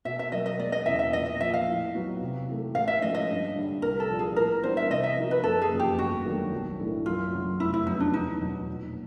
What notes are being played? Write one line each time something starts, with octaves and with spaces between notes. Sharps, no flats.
B2 E5
E5
F#3 A#3 D#5
D#5
E1 D5
D#5
E2 C#3 E5
E5
A#1 D#5
D#5
A#2 F3 E5
F5
A2
F#3 B3 D#4 F#4
C3
E3 A3
A1 F5
E5
G#2 F3 A3 C#4 D#5
D#5
G2
D3 G3
C2 A#4
A4
A#2 F3 A#3
G#4
A2 A#4
E3 G3 B3 D4 C5
E5
C3 D#5
E5
F3 A#3 D#4 F#4
B4
F#1 A4
G#4
F2 C#3
G4
G1 F#4
G2 D#3 F#3 A3
B1
A2 E3 A3 D4
F#2 F4
C#3 F#3
F1 E4
E4
F2 C#3 F#3 B3 D#4
D4
E2 D#4
B2 F#3
A#1